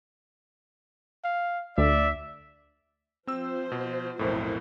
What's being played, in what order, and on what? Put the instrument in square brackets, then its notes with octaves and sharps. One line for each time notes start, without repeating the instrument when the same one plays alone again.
[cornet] F5
[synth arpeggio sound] D2 [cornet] D5 [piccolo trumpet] E5
[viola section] F3 C5 [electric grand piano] C4 E6
[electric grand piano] B2
[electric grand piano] B1 F2 A2 [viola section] E4 A#4 C5